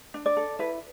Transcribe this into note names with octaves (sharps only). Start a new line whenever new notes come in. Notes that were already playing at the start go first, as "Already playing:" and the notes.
D4
D5
A4
E4 B4